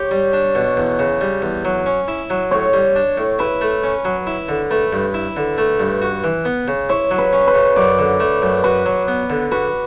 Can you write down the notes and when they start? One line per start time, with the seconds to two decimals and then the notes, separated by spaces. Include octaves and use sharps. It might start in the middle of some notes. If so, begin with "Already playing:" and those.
Already playing: G4 C#5
0.11 G3
0.33 D4
0.55 B2
0.77 E2
0.99 C#3
1.21 G3
1.42 E2
1.65 F#3
1.86 C#4
2.08 E4
2.30 F#3
2.51 A2 C#5
2.73 G3
2.96 D4
3.17 A2
3.39 E4 B4
3.61 A3
3.84 C#4
4.05 F#3
4.27 E4
4.49 D3
4.71 A3 B4
4.93 G2
5.14 E4
5.37 D3
5.58 A3
5.80 G2
6.02 F#4
6.24 E3
6.45 B3
6.68 C#3
6.89 E4 C#5
7.11 F#3
7.18 B4
7.33 C#4
7.48 B4
7.55 C#3
7.76 F#2 D5
7.99 D3
8.20 A3
8.42 F#2
8.64 F#4 B4
8.86 F#3
9.08 B3
9.30 D3
9.52 F#4 B4